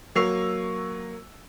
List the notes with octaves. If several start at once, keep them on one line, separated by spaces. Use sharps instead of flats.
F#3 A#3 C#6 E6 C7 F7